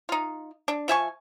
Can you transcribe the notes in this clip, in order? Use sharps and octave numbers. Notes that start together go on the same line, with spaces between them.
D#4 F4
D4
F3 E5 G#5 C#6